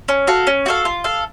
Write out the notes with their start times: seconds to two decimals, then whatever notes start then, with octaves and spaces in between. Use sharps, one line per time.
0.08 C#4
0.27 F#4 A4 F5
0.47 C#4
0.66 F#4 A4 F5
0.85 F4
1.04 A4 F5